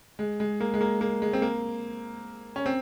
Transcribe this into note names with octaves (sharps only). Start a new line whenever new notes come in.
G#3
G#3
A#3
G#3
A#3
A#3
G#3
C4
A#3
C#4
C4